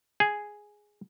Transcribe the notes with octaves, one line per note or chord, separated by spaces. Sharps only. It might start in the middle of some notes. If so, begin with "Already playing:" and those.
G#4